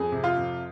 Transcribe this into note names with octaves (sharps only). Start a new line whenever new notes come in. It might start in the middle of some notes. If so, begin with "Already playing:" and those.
Already playing: F2 G#4
C3
F4
F2